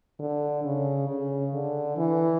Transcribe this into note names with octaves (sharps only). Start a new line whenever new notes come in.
D3
C#3
C#3
D3
E3